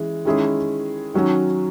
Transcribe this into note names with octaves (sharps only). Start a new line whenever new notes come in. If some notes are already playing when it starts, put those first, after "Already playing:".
Already playing: E3 G#3 C#4
D#3 G#3 C#4 E4 G#4
D#3 F#3 C#4 F#4